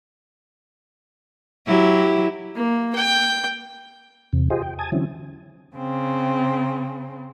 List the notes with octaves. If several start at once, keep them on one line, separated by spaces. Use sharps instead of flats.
F#3 E4 G4
A#3
G5
E2 C3
F4 G4 G#4 C5 D#5
G5
G#5 A5 D#6 G#6
D3 E3 F#3 C4 C#4 E4
C#3 C4